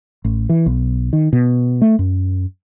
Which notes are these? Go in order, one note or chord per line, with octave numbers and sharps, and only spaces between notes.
A1
E3
B1
D#3
B2
A3
F#2